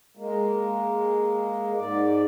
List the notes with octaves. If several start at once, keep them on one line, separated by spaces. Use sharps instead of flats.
G#3 A#3
G#2 D5